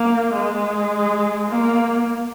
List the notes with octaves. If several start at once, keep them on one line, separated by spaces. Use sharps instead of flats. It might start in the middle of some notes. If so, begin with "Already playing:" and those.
Already playing: A#3
G#3
A#3